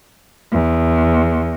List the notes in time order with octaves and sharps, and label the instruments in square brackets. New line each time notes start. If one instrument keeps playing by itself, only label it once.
[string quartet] E2